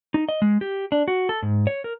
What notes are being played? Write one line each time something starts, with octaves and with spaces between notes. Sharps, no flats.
D#4
D#5
G#3
G4
D4
F#4
A4
G#2
C#5
A#4